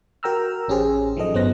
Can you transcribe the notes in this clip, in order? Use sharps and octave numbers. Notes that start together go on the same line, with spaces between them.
F#4 A#4 G5 A#5 E6 F6
A1 C#4 G4 G#4 C5
D#3 F3 F#3 A4 D#5
G1 F#3 B3 C5 F#6 A#6